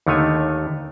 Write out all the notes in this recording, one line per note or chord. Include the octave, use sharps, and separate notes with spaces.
D#2 D3 D#3 A3 C#5 G#5